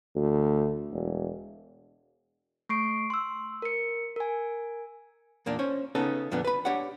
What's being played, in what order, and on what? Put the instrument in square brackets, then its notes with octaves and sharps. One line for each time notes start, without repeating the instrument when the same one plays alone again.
[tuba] D2
E1
[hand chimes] A3 C#6 C7 D7
C6 E6
A#4 C#7
A#4 G#5
[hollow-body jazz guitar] E2 A#2 A#3 D4
C#4 C5 C#5
C#3 B3 C#4 D#4 A4
F2 A#2 D3 F3 B3 D4
B4 B5
D4 G4 C#5 F#5